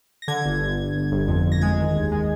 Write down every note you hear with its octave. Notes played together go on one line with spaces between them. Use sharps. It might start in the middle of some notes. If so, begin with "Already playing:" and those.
A#6
D3 G#6
G1
G1
G1
G1
G1
F2
G1
A#6
G#3 G#6
D#3
D#2
G#3